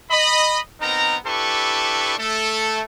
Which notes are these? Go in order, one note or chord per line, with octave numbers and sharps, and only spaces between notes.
D#5 B5
B3 C4 D#4 A#4 A#5
D4 E4 G4 A4 B4 C#6
A3 A4